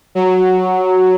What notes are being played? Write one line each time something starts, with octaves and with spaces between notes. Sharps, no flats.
F#3